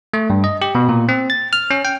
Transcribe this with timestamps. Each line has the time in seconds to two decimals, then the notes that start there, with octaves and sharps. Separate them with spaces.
0.14 A3
0.30 G2
0.44 D#5
0.62 G4
0.75 B2
0.89 A#2
1.09 C4
1.30 A6
1.53 F6
1.70 C#4
1.85 G5